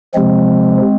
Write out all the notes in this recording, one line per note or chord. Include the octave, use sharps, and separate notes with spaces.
C3 F3 G#3 C4